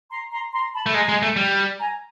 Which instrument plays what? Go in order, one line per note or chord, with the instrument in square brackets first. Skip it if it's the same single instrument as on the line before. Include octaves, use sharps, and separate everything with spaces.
[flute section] A#5 C6
A#5 C6
A#5 C6
A5 B5
[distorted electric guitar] A3
[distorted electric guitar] G#3 [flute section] G#5 A#5
[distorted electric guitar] G#3
A3
G3
[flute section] G#5 A#5